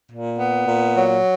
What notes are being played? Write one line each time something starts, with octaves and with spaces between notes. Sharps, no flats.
A#2
B3
A#2
F#3